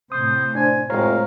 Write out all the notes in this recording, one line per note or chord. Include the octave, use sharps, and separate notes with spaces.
A2 C3 C5 D#6
D4 C5 G#5
F1 A2 G#3 C5 C#5 F5 A#5